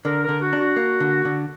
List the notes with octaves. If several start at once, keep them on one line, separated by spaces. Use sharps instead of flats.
D3 A#4
A#4
D3
F#4
D4
F#4
A#3
D3
D3